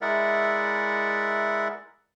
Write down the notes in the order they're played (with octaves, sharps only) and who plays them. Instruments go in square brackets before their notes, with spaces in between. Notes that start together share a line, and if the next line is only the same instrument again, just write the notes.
[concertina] G#3 E4 A#4 D5 E5 F#5